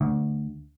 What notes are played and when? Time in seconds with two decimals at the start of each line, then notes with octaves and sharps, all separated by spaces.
0.01 D2